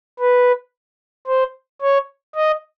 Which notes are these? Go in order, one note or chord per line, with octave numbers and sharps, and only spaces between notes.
B4
C5
C#5
D#5